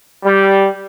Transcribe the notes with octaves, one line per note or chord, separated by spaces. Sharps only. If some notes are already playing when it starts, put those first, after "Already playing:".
G3